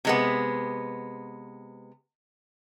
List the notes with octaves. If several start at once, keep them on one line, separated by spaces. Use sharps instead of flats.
C3 G#3 B3